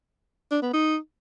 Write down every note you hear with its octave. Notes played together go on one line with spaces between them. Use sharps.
D4
B3
D#4